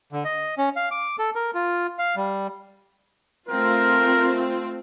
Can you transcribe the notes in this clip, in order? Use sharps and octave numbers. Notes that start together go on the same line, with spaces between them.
D3
D#5
C#4
F5
D6
A4
A#4
F4
F5
G3
A3 C4 F4 A#4